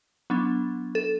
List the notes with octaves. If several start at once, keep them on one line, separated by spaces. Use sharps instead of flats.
F#3 B3 D4
A4